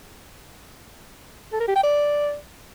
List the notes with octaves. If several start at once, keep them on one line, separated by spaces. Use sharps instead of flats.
A4
A#4
G4
G5
D5